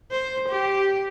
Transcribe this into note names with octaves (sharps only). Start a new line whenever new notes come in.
C5
G4